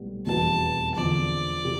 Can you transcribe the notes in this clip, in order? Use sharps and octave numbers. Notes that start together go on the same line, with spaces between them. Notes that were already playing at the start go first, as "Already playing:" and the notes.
Already playing: B1 A2 G3 B3
F1 E2 B2 G3 B3 A5
E2 D3 F3 C4 D5
C3